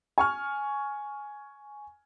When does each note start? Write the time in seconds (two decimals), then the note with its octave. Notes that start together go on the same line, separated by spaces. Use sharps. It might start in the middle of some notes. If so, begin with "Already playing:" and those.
0.18 G#5 C#6 F6